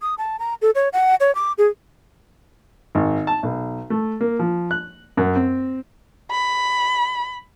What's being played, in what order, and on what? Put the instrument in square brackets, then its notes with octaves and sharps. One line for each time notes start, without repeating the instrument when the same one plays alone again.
[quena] D#6
A5
A#5
A4
C#5
F#5
C#5
D6
G#4
[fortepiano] G#1
A5
B1
A3
A#3
F3
F#6
F#2
C4
[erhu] B5